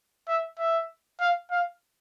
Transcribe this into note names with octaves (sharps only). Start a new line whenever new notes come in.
E5
E5
F5
F5